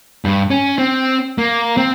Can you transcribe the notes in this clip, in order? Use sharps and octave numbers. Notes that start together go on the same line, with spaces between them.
G2
C#4
C4
A#3
C4